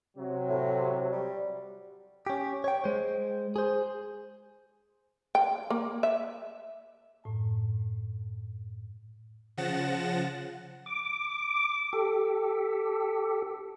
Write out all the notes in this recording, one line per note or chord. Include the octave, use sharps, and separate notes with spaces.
C3 F#3
A2
G3
C#4 G4
C#5 G5
G#3 C5
G#4 C5
G5
A#3
E5
F#2 A2 A5
C#3 F3 F#5 A6 A#6 E7
D6
G4 A4